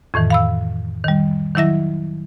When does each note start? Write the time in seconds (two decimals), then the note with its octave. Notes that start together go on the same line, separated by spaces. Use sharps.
0.14 F2 A2 D#3 E3
0.30 F5 B5 E6
1.04 D#3 G3
1.55 D#3 F#3 E4 E5 A#6